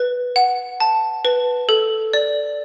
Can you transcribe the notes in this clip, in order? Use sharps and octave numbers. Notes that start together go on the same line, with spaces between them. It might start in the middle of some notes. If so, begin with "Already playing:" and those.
Already playing: B4
F#5
A5
B4
A4
D5